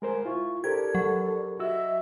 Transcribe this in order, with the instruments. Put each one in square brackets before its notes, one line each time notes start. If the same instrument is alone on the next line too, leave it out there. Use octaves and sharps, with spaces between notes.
[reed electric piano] G#3 A#4 C5 [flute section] G#5
[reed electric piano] E4 F4 [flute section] C#6
[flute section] D4 A4 D5 [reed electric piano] G4 A#4 C5 [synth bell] G#6
[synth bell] F#3
[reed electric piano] F#4 E6 [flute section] D#5 E5